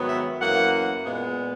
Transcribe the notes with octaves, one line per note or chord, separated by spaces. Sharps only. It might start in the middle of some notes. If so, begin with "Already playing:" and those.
Already playing: G#2 D#3 F#3 B3
E5
F#2 E3 A#3 F#5
A#2 G#3 B3